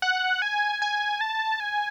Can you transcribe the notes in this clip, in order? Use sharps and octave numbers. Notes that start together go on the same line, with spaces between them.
F#5
G#5
G#5
A5
G#5